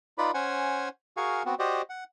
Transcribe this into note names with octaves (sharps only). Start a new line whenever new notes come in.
D#4 F4 B4 D5 B5
C#4 C5 F#5 G#5
F#4 G#4 A#4 F5 G#5 C#6
B3 C4 F#4
F#4 G4 C5 D5 D#5
F#5